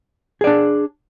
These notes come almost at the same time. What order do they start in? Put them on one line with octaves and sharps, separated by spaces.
G#4 D5 D4